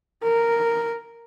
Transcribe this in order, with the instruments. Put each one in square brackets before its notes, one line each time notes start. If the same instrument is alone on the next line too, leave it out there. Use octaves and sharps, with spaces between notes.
[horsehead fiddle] A#4